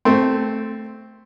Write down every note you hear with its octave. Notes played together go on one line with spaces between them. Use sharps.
A3 C4